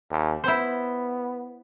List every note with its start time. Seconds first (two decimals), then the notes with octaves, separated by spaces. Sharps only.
0.11 D#2
0.44 B3 E4 C5